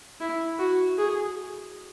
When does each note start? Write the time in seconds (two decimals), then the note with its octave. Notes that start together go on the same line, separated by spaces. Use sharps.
0.20 E4
0.59 F#4
0.98 G#4